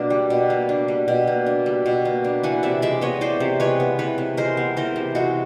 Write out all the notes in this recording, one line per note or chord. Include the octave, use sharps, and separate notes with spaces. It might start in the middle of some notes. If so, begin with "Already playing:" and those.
Already playing: B2 A#3 D4
G3
B2
A#3
D4
G3
B2
A#3
D4
G3
B2
A#3
D4
E3 F#5 G#5
C3 D5 E5
G#3 D5 E5
B3 C#5 D#5
E3 C5 D5
C3
G#3 B4 C#5
B3
E3 B4 C#5
C3
G#3 A#4 C5
B3
E3 A#4 C5
C3
G#3 E4 F#4